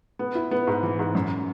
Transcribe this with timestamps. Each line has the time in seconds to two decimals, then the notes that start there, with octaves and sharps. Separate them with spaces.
0.19 B3
0.35 E4
0.51 B3
0.67 G#2
0.83 E3
0.99 G#2
1.15 F#2